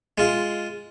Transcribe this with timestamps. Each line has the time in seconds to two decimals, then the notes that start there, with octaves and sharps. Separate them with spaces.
0.18 G#3 F4